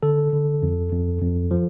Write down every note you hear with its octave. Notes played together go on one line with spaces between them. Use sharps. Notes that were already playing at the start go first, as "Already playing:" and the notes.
D3 A4
D3
F2
F2
F2
F3